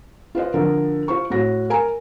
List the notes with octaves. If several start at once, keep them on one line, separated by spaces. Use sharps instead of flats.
F4 B4 C5 D#5
D3 F3 A#4
F4 C5 C#6
A2 F#4 A#6
A#4 G#5 A#5